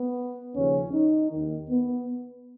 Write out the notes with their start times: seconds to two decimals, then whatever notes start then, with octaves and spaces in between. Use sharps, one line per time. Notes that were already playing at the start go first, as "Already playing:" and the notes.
Already playing: B3
0.55 D#2 C#3 F3 C#4
0.93 D#4
1.31 D#2 D#3
1.70 B3